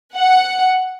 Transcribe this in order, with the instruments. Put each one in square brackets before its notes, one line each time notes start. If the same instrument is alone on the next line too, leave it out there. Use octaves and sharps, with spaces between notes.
[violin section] F#5